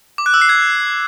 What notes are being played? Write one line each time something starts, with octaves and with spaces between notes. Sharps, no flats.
D6
F#6
E6
C7
G#6